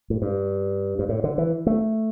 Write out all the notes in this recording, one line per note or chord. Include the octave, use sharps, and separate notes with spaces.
A2
G2
G2
A2
D3
E3
A3